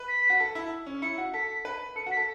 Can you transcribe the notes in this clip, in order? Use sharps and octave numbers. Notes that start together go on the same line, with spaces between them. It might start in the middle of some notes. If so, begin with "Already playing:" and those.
Already playing: B4
B6
F#4
A4
E4
C#4
E4 C#7
F#4
A4 B6
B4
A4 C#7
F#4
B6
A4